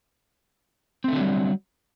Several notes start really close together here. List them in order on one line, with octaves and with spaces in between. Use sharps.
C4 A3 D3 F#3 G3